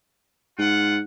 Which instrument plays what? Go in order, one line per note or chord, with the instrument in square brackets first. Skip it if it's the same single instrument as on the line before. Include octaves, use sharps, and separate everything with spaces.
[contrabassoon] G#2 [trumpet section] F4 F#5